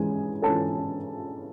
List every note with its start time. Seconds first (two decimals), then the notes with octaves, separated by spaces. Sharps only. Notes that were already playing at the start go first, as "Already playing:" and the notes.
Already playing: E3 G#3 C#4 G#4 G#5
0.42 E3 G#3 C#4 A4 A5